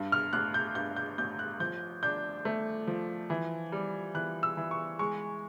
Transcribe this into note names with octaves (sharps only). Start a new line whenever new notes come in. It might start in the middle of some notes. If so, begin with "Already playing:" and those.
Already playing: G2
F6
A1 F#6
G6
G2 G6
G6
A1 G6
F#6
F3 G6
D4 G6
A3
F3
E3
G3
E3 F#6
E6
E3
C#6
G#3 C#6